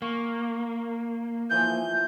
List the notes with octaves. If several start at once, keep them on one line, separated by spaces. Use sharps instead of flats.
A#3 C#6
E3 F3 G6